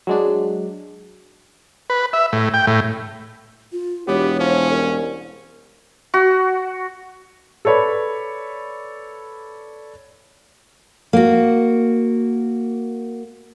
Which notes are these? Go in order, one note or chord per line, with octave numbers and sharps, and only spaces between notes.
F#3 G#3 D4
B4
E5
A2
G5
A2
F4
E1 B3 G4 C#5
F3 C#4
C2
F#4
A4 B4 C#5 D5 B5
A#3 F#4